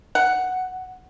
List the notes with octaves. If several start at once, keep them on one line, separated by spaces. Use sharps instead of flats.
F#5